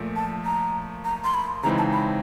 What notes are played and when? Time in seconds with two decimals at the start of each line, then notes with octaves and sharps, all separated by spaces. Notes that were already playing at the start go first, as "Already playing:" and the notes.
Already playing: A#2 F3 A3
0.16 A5
0.46 A#5
1.05 A#5
1.24 C6
1.34 B5
1.63 C#3 E3 G#3 C4 D#4 A#5
1.78 A5
1.92 B5